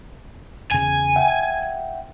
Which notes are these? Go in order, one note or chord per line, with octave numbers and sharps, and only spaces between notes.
E2 C#3 G#5
E5 F#5 G5